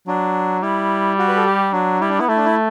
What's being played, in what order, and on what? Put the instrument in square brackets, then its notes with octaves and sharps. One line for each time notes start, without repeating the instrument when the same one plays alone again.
[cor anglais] F#3 [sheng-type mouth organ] D4
[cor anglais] G3 [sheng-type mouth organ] E4
[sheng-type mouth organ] F#4
B4
A4
G4
[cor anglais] F#3 [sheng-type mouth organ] D4
[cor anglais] G3 [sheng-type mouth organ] E4
[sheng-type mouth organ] D4
[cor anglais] B3 [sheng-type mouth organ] E4
[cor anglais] A3 [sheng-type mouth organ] E4
[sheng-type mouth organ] D4
E4